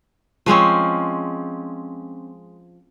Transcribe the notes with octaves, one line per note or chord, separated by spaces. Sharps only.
F3 G#3 C4 C#4